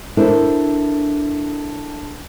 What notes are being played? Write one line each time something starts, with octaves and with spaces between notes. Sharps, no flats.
D4 E4 A4 A#4 C5